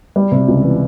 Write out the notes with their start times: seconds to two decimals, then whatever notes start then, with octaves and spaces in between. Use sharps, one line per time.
0.16 G3
0.32 C3
0.48 C#2
0.64 E3